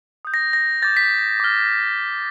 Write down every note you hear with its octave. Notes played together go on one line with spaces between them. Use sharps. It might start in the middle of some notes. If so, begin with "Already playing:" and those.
D#6 G6
A#6
A#6
D6 G6 A6
B6
D6 F6